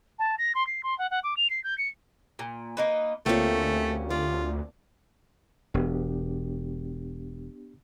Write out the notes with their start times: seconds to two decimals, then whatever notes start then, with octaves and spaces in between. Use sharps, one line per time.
0.19 A5
0.38 A#6
0.54 C6
0.66 C7
0.83 C6
0.98 F#5
1.10 F#5
1.23 D6
1.36 F7
1.50 C7
1.63 G6
1.78 C#7
2.39 A#2
2.77 A#3 D#4 B4
3.26 D2 A3 A#3 C4 C#4 F4 G4
4.10 F4 D5
5.74 E1 B3 D4 G4